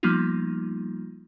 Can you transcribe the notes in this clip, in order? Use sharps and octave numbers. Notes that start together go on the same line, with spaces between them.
F3 G3 A#3 B3 D#4 F4